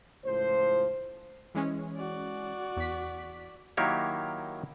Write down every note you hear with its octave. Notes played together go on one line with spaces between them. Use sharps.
C#2 A2 F3 C5
E3 G#3 C#4
F#4 D5
E2 B6
D#3 F#3 A#3 E4 G4 C#5